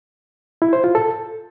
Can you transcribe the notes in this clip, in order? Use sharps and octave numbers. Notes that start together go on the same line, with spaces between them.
E4
C5
F4
A4